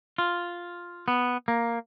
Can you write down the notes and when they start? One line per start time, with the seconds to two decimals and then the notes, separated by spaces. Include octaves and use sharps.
0.18 F4
1.08 B3
1.48 A#3